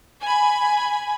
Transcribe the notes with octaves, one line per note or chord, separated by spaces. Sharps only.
G#5 B5